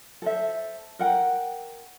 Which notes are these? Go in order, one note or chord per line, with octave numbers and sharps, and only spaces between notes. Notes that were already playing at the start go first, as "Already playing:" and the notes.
A4 C5 E5
A#4 F#5 G5